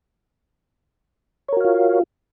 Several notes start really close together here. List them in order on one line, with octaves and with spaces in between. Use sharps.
C#5 A#4 F#4 F5 F4